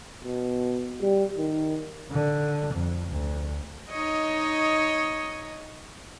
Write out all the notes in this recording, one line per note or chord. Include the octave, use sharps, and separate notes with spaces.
B2
G3
D#3
D3
F2
D2
D#4 C#5 D#5